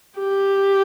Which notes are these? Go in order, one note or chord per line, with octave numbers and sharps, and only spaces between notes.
G4